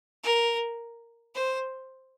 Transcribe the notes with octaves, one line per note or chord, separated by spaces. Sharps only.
A#4
C5